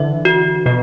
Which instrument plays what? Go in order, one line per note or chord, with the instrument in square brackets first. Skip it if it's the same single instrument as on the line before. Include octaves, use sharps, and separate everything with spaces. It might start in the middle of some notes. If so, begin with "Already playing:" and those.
Already playing: [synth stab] D3 E3 [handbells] E5
[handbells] F#4
[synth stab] B2 [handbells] F#4